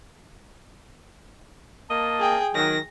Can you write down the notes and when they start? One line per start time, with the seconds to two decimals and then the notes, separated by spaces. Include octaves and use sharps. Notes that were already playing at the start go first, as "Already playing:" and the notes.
1.90 A#3 D#5 A5
2.20 G#4 G5
2.55 D#3 F#3 A#6